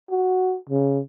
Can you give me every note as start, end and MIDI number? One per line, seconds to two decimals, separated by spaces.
0.10 0.56 66
0.69 0.99 49